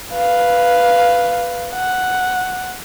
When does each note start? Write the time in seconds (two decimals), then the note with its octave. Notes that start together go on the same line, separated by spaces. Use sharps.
0.13 B4 F5
1.74 F#5